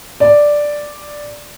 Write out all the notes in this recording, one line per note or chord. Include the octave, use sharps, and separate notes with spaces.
D5